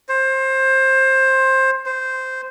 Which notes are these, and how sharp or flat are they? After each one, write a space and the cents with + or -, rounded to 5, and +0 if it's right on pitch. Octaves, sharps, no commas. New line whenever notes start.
C5 +20
C5 -10